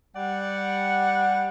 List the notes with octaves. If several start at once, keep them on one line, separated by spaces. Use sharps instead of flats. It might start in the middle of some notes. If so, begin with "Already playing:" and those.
G3 D5 F#5